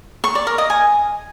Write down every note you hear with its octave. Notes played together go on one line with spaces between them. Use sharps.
C#6
D5
A#4
D#5
G#5